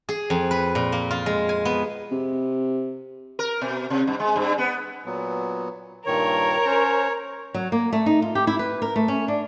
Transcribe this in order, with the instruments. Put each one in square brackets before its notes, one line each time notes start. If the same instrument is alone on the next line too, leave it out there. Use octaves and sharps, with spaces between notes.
[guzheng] G#4
F2
B4
A#2
A#3
F4
G#3
G#5
B3
[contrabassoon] C3
[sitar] A#4
B2
C3
G2
G#3
G2
B3
[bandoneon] A#2 F#3 B3
[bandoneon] G2 A#2 D#3 [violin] A#4 [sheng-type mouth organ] C#5
[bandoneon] C#4 C5
[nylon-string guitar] F#3
A#3
A3
D#4
F4
G4
E4
B4
A#4
A3
C#4
D4